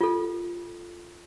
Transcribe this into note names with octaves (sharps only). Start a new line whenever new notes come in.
F4 A4